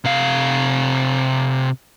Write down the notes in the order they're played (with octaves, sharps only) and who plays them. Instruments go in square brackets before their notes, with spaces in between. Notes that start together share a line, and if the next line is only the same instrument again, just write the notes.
[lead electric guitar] C3 F5